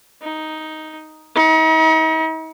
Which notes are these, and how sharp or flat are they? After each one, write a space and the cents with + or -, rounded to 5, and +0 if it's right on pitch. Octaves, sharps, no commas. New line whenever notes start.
D#4 +5
D#4 +40